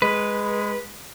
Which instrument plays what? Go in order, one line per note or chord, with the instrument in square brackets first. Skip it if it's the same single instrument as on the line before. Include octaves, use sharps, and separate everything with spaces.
[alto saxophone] G#3 [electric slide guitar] B4